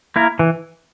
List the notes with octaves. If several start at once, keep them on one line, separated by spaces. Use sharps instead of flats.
A#3 E4 A#4
E3